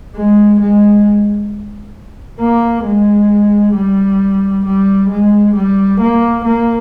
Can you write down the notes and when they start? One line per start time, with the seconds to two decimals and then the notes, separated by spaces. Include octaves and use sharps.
0.16 G#3
0.61 G#3
2.40 A#3
2.85 G#3
3.75 G3
4.65 G3
5.10 G#3
5.55 G3
6.01 A#3
6.45 A#3